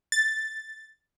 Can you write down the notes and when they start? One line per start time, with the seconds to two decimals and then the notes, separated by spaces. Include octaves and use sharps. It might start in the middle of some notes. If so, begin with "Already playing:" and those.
0.12 A6